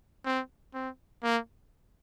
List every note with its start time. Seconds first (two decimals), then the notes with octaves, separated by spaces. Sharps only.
0.25 C4
0.74 C4
1.23 A#3